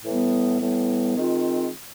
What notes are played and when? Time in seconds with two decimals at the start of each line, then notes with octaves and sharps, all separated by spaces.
0.04 A2 E3 G3 B3
0.60 A2 E3 G3 B3
1.16 D#3 G#3 C4 F4